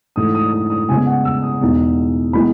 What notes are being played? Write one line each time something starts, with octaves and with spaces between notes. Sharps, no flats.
G#2 E3 A3 E4 D#6
D#6
D#6
D#6
C#3 G#3 B3 G#5
F#5
E6
D#6
E2 B2 G#3 D#4
E3 G#3 B3 B5